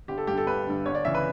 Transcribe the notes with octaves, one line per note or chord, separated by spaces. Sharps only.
G1 G4
A4
G2 D3 G4
A4
G1 B4
G2 D3
G1 C#5
D5
C#3 E3 E5
B4